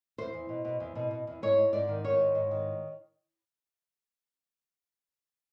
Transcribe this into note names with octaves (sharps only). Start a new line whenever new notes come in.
E2 C5
E2
B2
B2
E2
B2
B2
E2
G#2 C#5
G#2
G#2 D5
D#3
D#3 C#5
G#2
G#2
D#3